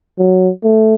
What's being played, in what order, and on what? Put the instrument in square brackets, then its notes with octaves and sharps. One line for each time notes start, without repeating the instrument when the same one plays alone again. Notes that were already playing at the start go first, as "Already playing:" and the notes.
[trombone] F#3
A3